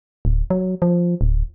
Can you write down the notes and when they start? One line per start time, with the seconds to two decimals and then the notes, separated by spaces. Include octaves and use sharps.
0.25 D1
0.50 F#3
0.82 F3
1.21 D1